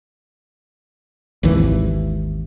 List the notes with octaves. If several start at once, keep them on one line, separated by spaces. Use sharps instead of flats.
G#1 D#2 E3